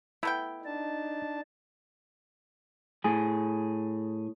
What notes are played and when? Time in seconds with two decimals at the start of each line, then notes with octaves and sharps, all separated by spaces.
0.23 A3 B3 E4 G5
0.65 D4 D#4 A5
3.04 A2 G#4